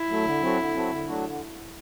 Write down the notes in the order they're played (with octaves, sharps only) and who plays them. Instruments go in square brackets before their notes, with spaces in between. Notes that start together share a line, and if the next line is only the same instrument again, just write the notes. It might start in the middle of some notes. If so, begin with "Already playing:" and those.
Already playing: [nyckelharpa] E4
[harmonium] F#3 A3
D3
F#3 C4 F#4 A4
D3
F#3 C4 F#4 A4
D3
F#3 A3 D4 F#4
D3